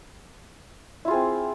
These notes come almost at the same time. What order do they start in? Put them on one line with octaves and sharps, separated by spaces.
E4 F4 G#4 C4